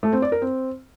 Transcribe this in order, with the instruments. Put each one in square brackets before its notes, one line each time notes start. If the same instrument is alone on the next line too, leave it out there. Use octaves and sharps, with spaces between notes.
[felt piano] A3
C4
D5
A#4
C4